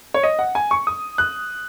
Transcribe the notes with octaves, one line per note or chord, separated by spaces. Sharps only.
C#5
D#5
F#5
G#5
C#6
D#6
F#6